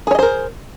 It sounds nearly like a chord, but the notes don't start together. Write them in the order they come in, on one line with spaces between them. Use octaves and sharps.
G#4 C#5 D#5 C5 A#4